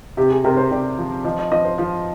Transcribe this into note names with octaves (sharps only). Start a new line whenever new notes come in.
C3 G4
G#4
C3 A#4
C5
C3 D5
F3
F3 D#5
D#5
F3 D#5
C5
F3 F4